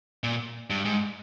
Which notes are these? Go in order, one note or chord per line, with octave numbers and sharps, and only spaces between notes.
A#2
G2
G#2